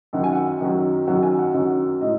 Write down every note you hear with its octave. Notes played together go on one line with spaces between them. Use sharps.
F#2 D#3 F#3 F#5
G#5
F#5
F#2 D#3 F#3
F#2 D#3 F#3 F#5
G#5
F#5
F#2 D#3 F#3 F#5
A2 G#3 D#4 D#5